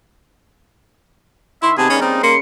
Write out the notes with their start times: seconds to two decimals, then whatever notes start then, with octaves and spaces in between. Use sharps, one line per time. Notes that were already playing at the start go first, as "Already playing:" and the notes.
1.62 D#3 E4 E5 C6 C#6
1.78 C3 B3 G#4 D#5 A5
1.90 C#3 G3 A#3 C#4 A6
2.02 C4 D#4
2.23 A#3 C6 C#7